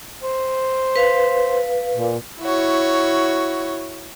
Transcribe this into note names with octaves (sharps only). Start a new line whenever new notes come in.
C5
B4 F5
A#2
E4 F#4 C#5